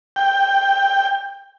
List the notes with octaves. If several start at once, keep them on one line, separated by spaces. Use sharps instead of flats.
G5